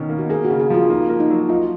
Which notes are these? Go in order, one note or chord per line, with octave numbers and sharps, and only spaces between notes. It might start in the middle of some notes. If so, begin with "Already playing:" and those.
Already playing: B2 D#3 C#4
A#3
F#4
A#3 G#4
F#4
C#3
G#4
F3 F4
A#3 D#4
A#3
D#4
F#3
D#4 F4